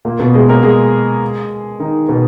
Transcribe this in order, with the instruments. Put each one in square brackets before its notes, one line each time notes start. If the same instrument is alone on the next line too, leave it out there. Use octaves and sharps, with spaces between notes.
[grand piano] A#2 A#3
B2 B3
G#3 G#4
A#3 A#4
G#3 G#4
D#3 D#4
B2 B3